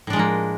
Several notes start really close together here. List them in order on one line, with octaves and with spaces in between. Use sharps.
A2 D4 G#3 F3 A#3